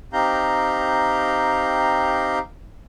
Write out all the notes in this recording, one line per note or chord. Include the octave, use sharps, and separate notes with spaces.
C4 D#4 G4 F5 A#5 G6